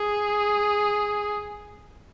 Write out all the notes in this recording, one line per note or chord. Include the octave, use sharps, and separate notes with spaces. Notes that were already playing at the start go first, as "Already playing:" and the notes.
Already playing: G#4